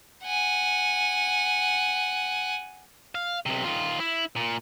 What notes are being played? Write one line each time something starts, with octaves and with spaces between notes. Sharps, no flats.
F#5 G#5
F5
B1 C3
D#3 F4
E4
A#2